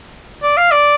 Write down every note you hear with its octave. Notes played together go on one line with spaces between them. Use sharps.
D5
F5
D5